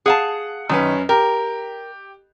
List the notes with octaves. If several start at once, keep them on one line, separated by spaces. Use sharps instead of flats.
G#4 F5 F#5 A5
F#2 D#3 C#4 B4
G4 A#4